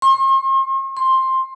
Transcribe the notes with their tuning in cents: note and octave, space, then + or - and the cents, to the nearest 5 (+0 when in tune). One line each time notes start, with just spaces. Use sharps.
C6 +40
C6 +10